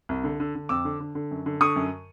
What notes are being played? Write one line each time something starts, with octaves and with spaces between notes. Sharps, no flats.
C2
D3
D3
D3
F2 D6 E6
D3
D3
D3
F#2
D3
D3 C#6 D#6
F#2